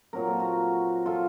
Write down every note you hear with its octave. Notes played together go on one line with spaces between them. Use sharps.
A#2 F#3 C4 A#4
A4
F#4 A#4
F4 A4